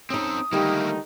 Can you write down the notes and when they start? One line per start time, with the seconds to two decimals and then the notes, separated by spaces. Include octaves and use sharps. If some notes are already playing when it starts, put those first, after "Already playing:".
0.10 C4 C#4 D#4 A4 D#6
0.53 D3 D#3 G3 A3 A#3 D#4